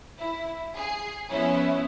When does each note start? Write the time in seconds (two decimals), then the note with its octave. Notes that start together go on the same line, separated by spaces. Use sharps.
0.18 E4
0.77 G#4 C7
1.31 F3 B3 C#4 E4